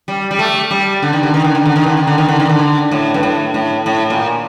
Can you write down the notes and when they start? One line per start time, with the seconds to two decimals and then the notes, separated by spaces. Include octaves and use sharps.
0.08 G3
0.31 G3
0.39 A3
0.71 G3
1.02 D3
1.13 D#3
1.23 D3
1.34 D#3
1.44 D3
1.55 D#3
1.66 D3
1.76 D#3
1.86 D3
1.97 D#3
2.07 D3
2.18 D#3
2.28 D3
2.40 D#3
2.49 D3
2.91 A2
3.14 G2
3.23 A2
3.54 A2
3.86 A2
4.10 A#2